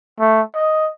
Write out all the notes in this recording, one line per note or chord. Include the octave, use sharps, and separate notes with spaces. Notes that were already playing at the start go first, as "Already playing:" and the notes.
A3
D#5